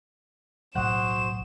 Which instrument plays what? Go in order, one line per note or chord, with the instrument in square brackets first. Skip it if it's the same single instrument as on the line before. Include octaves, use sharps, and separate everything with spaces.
[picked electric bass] B1 A2 F#3 [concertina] F#4 C5 [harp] F#5 D#6 [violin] E7